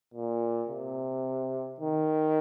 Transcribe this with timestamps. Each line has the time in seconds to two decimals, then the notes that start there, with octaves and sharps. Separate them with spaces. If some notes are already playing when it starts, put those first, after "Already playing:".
0.14 A#2
0.69 C3
1.80 D#3